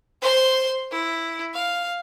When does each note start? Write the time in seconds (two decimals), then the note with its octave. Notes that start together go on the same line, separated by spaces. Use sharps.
0.22 C5 C6
0.91 E4
1.54 F5